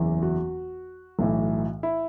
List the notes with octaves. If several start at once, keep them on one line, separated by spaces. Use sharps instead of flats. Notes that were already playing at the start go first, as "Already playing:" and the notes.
Already playing: F#1 E2 E3
F#4
B1 A2 E3
E4